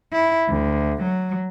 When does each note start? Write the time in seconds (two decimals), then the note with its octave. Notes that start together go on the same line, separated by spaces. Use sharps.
0.12 E4
0.49 D2
1.03 F#3